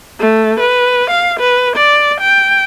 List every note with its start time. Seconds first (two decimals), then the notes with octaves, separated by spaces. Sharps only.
0.19 A3
0.60 B4
1.10 F5
1.39 B4
1.76 D5
2.21 G5